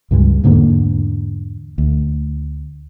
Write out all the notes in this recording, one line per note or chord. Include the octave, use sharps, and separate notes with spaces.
C#2 G2 F3 G#3
E2 G#2 D3 A#3
D2